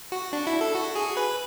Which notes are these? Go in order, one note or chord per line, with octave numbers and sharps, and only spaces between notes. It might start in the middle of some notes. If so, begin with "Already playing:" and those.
F#4
D4
E4
A4
F#4
G#4
B4